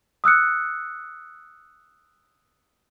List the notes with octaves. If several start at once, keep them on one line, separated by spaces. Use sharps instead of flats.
D#6 E6 F#6 C#7